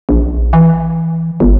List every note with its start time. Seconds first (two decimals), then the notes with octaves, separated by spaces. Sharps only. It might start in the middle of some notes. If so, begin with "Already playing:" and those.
0.09 A#1
0.53 E3
1.40 G1